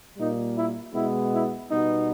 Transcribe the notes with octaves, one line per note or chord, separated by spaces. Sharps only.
A#2 G3 A#3 D#4
E4
B2 G#3 B3 E4
E4
B2 G3 B3 D#4